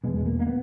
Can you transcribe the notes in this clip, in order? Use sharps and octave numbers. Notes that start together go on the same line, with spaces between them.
E2 B2 G#3
G#3
A#3
A#3
B3